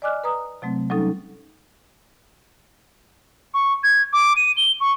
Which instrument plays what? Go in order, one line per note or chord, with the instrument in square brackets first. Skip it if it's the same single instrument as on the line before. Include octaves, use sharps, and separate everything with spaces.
[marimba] D5 D#5 G#5 D6 F6 F#6
B4 A#5 D#6
C3 F#3 A3 C4
F#3 G3 C#4 D#4 A4
[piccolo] C#6
G#6
D6
D#7
G7
C#6